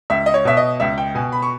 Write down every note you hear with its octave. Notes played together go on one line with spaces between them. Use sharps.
C#2 E5
D#5
C#5
B2 E5
D#5
C#2 E5
G5
B2 G#5
B5
C#6